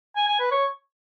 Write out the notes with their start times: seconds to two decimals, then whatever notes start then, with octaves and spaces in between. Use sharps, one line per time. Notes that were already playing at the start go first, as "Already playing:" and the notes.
0.16 G#5
0.28 G#5
0.40 B4
0.51 C#5